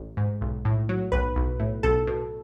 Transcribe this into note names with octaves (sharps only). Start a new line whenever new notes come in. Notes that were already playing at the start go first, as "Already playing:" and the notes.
Already playing: A1
G#2
B1
A2
F#3
B1 B4
B1
A2
B1 A4
B2